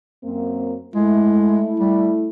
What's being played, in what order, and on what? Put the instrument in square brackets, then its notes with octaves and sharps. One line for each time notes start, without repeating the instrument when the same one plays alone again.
[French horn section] F#2 A#3 C4
[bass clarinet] G#3 [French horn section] A3 E4
[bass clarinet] G3